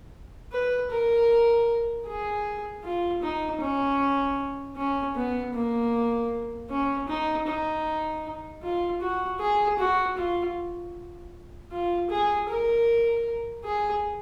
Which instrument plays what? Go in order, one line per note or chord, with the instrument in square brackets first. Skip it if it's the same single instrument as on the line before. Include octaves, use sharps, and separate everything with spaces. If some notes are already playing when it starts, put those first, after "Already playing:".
[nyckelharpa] B4
A#4
G#4
F4
D#4
C#4
C#4
B3
A#3
C#4
D#4
D#4
F4
F#4
G#4
F#4
F4
F4
G#4
A#4
G#4